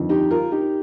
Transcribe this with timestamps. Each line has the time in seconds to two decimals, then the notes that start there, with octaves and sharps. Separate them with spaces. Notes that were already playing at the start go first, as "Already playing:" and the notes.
Already playing: G1 F2 D#3
0.09 D#4 G4
0.31 F4 A#4
0.51 D#4 G4